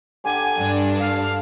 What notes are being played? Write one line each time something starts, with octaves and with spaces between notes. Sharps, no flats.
D3 G4 G#5 D6
G2 D4
F5